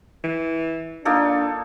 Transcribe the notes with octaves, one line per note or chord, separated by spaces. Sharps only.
E3
A#3 D4 D#4 F4 A4